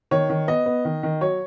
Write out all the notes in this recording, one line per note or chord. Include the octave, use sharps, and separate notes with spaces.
D#3 C#5
D#3
B3 D#5
B3
D#3
D#3
F#3 C#5